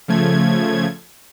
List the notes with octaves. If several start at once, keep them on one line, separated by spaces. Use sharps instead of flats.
C#3 F3 A3 G#6